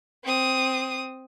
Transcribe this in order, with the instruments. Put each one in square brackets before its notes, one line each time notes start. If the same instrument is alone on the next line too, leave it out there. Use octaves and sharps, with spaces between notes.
[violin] C4 D#6